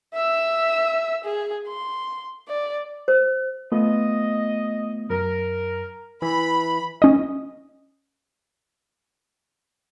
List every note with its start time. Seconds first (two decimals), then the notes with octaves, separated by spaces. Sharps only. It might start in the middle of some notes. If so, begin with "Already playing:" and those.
0.14 E5 E6
1.24 G#4
1.67 C6
2.48 D5
3.08 C5
3.72 A3 B3 F4 D#5
5.10 F#2 A#4
6.22 E3 B5
7.02 C#4 D#5